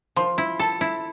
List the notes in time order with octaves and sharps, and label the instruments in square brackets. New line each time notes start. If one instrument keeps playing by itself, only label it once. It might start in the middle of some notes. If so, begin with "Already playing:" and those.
[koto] F3 [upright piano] C6
[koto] E4
[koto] A4 [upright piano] A5
[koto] E4